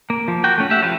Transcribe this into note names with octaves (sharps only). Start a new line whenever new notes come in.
A#3
F3
F#4 G5
A3 C#4
G4 E5 F#5
F3 F4 B4 C#5